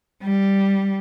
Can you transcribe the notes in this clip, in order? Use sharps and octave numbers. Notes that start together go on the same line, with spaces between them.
G3